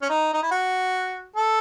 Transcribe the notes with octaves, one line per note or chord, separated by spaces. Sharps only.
C#4
D#4
D#4
E4
F#4
A4